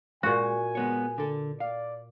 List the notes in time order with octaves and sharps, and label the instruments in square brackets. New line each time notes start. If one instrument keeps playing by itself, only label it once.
[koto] A#2 F#4 [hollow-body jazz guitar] G#3 [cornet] G#5
[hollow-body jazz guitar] G#3 B3 C#5
D3 A4
[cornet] D5 [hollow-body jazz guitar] F5